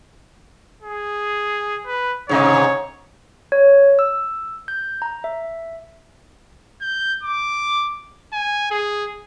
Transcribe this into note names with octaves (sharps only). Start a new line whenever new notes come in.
G#4
B4
G#2 C3 C#5 D#5
C#5
E6
G6
A#5
E5
G6
D6
G#5
G#4